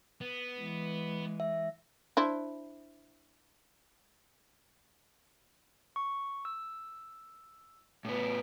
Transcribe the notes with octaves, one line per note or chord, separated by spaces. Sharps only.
B3
E3 G#3
E5
D4 E4 C5
C#6
E6
A2 B3